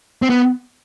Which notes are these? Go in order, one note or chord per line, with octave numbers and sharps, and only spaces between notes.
C4
B3